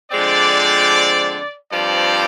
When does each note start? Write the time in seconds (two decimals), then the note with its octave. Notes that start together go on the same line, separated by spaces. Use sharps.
0.11 D3 F3 G#3 C4 D5
1.71 G2 F3 C4 D5